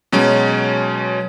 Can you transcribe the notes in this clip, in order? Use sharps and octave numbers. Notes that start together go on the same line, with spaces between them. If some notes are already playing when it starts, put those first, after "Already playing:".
B2 F#3 G#3 C#4